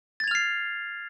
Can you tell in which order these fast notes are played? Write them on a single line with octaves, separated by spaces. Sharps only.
A6 G#6 F7 F6 C7